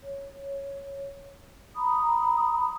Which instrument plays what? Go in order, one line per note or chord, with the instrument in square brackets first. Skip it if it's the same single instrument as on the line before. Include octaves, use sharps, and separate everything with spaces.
[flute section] C#5
A#5 B5 D#6